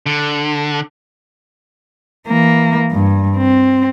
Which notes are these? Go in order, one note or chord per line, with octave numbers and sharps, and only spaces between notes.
D3
E3 A#3
G2
C4